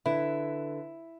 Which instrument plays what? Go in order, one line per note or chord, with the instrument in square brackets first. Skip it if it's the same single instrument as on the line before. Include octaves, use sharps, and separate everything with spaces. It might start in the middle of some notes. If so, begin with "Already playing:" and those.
[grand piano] D3 B4 [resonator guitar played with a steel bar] E4